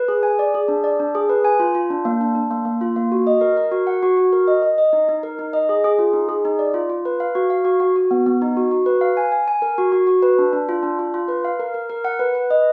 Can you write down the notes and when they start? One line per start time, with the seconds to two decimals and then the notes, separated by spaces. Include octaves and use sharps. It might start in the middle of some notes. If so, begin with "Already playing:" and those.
Already playing: B4
0.08 G#4
0.23 G#5
0.39 D5
0.54 G#4
0.68 D4
0.84 D5
1.00 D4
1.15 G#4
1.29 B4
1.44 G#5
1.60 F4
1.75 F4
1.90 D4
2.05 A#3
2.21 D4
2.35 D4
2.51 A#3
2.65 A#3
2.81 F4
2.96 A#3
3.12 F#4
3.27 D#5
3.41 A#4
3.57 A#4
3.72 F#4
3.87 F#5
4.03 F#4
4.17 F#4
4.33 A#4
4.48 D#5
4.63 D#5
4.78 D#5
4.93 D#4
5.09 D#4
5.23 A#4
5.39 D#4
5.53 D#5
5.69 G#4
5.84 G#4
5.99 F4
6.13 D#4
6.29 G#4
6.45 D#4
6.59 D5
6.74 F4
6.90 F4
7.05 B4
7.20 F5
7.35 F#4
7.50 F5
7.65 F#4
7.80 F#4
7.96 F#4
8.11 B3
8.26 B3
8.42 D#4
8.57 F#4
8.71 F#4
8.86 B4
9.01 F5
9.17 G#5
9.32 G#5
9.48 G#5
9.62 A#4
9.78 F#4
9.92 F#4
10.07 F#4
10.22 B4
10.38 D4
10.53 D4
10.69 F4
10.83 D4
10.99 F4
11.14 F4
11.28 B4
11.44 F5
11.59 A#4
11.74 A#4
11.90 A#4
12.05 F#5
12.19 B4
12.35 B4
12.50 D#5